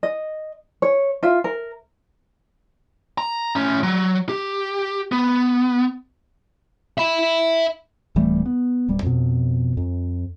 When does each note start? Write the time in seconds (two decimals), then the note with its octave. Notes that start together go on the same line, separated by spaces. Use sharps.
0.03 D#5
0.82 C#5
1.23 F4 E5
1.44 A#4
3.18 A#5
3.56 A2 C#4
3.83 F#3
4.29 G4
5.12 B3
6.98 E5 B5
8.16 D1 E3 G3 A3
8.46 B3
8.88 D1 G3
9.03 F2 B2
9.77 F2